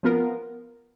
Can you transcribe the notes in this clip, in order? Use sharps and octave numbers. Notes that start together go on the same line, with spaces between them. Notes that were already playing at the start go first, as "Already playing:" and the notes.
F3 B3 F4 A#4